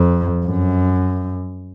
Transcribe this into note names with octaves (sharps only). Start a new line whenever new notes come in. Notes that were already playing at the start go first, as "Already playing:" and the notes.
Already playing: F2
F#2